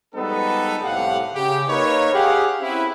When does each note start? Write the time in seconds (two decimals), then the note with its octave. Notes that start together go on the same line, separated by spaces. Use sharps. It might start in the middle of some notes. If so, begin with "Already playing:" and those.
0.15 F3 G3 G#3 B3 D#4 A4
0.84 C2 A2 A3 G4 F5 F#5
1.34 C#3 G4
1.69 A#3 D#4 A#4 B4 C#5
2.13 G4 G#4 F5 F#5
2.61 C4 C#4 E4 B4